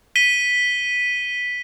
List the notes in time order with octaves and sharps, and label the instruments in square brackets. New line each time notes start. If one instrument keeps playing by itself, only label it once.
[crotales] B6 D#7 G7